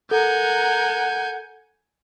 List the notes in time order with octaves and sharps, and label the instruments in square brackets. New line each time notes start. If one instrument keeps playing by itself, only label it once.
[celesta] A4 [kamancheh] A#4 [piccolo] F#5 [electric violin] G#5 G6